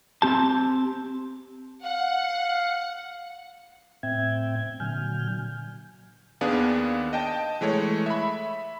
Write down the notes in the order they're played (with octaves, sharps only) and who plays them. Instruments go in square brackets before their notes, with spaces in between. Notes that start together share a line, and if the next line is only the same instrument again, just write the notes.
[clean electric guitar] C4 G4 A5
[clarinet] F5 [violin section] F#5
[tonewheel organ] A2 C4 E5 G5 G#6
A#2 D3 F#3 G#5 F6 G6
[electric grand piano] D#2 B3 D4 G#4 F5
D#5 G5 A5
E3 G#3 A3 C#5
E5 B5